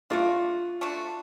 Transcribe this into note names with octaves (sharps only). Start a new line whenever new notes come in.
A3 D4 F4 F#4
A3 D4 F#4